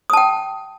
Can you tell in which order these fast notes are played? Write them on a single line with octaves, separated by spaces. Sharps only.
D#6 A5 G5